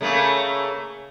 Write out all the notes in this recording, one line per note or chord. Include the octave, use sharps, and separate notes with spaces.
C#3 A3 A#3